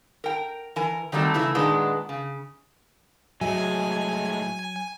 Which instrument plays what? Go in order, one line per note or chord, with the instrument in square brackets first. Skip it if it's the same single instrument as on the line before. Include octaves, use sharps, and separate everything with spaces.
[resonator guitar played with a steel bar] A#4 G5
E3 A#4 G#5
D#3 F#3 G3 A3 C4
C#3 E3 A3 E4
A#2 D#3 G#3 B3 D4
C#3
[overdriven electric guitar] A2 G#3 [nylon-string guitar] F#3 E5 [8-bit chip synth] G#5